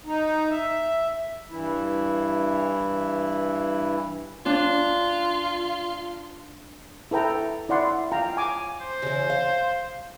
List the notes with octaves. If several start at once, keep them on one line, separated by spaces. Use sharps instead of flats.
D#4
E5
G2 E3 E4
D4 F4
E4 A4 B4 G5 A#5
E4 D5 F#5 C6
F4 F5 G5 A#5
G#5 D6
C5
C#3 E3
F5